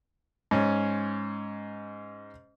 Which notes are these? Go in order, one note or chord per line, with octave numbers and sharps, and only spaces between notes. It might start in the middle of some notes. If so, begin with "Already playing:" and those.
G#2 C#4